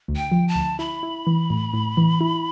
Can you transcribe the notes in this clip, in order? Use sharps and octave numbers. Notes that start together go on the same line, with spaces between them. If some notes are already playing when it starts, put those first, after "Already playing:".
D2
G5
F3
A5
D2
E4 B5
E4
E3
A2
A2
E3
E4